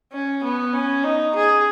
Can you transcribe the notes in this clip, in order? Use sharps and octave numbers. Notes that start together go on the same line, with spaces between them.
C#4
B3
C#4
D#4
G#4